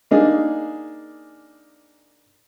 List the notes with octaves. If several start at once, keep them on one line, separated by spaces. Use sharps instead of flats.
A#3 D4 D#4 G#4